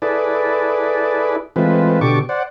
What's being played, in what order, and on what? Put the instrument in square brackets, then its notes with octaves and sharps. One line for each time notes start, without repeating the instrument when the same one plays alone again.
[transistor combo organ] E4 G#4 A4 B4 D5
E3 G#3 A3 C4 F4 B4
B2 D3 G4 A4 C#6 D6
C5 D5 F#5